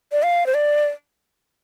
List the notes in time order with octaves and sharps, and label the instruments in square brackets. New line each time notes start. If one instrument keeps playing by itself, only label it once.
[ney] D5
F5
C5
D5